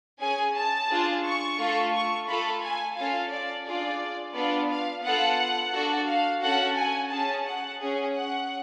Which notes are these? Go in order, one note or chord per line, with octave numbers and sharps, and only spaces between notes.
C#4 G#4 G#5
A5
D4 F4 G#4
C#6
A3 F4 A4
C#6
A3 F4 A4 B5
G#5
C#4 F4 A4 F5
D5
D4 F4 G#4 D5
B3 D4 F4 D5
F5
B3 F4 A4 F#5
D4 F#4 A4
F5
C#4 F#4 A4 F#5
G#5
C#4 G#4 A5
F#5
C#4 G#4
F#5